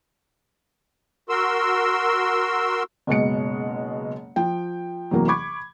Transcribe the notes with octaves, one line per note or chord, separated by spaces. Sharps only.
F#4 A#4 C6 E6
F#1 B2 G#3 C#7
F3 G5
E2 C3 E3 F#3 A#3
B5 C#6 D6 G#6